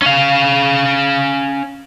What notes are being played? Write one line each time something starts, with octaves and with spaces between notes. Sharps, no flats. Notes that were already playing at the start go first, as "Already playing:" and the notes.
C#4 F5